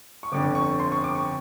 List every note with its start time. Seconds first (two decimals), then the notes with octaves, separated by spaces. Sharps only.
0.23 C#6
0.32 G1 F2 D3 D6
0.55 C#6
0.80 C6
0.92 C#6
1.04 D6
1.15 C#6